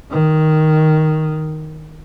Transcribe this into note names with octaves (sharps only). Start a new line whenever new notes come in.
D#3